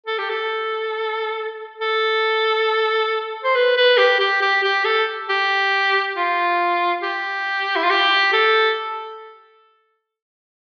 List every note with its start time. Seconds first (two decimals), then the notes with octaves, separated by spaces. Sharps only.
0.06 A4
0.18 G4
0.29 A4
1.81 A4
3.44 C5
3.55 B4
3.77 B4
3.98 G4
4.20 G4
4.42 G4
4.64 G4
4.85 A4
5.29 G4
6.16 F4
7.02 G4
7.76 E4
7.83 F4
7.90 G4
8.33 A4